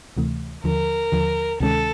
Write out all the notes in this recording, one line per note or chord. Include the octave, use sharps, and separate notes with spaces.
D2 C3 E3 A3
D#2 D3 F3 A#4
D#2 D3 F3
D2 C3 D#3 G#3 C#4 A4